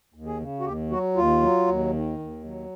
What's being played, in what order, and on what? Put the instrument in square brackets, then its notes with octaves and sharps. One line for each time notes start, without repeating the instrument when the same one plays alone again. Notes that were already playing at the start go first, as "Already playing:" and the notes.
[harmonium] D#2
G#4
C#3
F#4
D#2 G4
F#3 F#4
D#2 F4
F#3
D#2
D#3
D#2
F#3